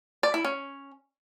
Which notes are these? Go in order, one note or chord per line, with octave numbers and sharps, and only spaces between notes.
D5
E4
C#4